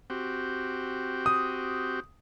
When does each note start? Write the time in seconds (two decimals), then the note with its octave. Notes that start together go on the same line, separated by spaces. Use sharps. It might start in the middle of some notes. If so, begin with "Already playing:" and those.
0.10 C4 F#4 G4
1.26 D#6